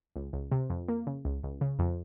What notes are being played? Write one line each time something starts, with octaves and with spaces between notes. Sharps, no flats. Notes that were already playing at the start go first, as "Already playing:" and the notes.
C#2
C#2
C3
F2
A#3
C#3
C#2
C#2
C#3
F2